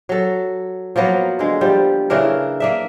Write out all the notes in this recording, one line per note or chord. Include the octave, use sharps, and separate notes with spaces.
F#3 A4
F3 F#3 A#3 B3
D3 G#3
F3 G3
C#3 E3 D4 A#4
A#3 D4 E5